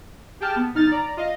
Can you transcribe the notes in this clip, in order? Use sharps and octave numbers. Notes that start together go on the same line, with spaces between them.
G4 G#4 G5 A5 F6
B3
G1 D#4 F6 A6
D5 A#5
F4 D#5 F5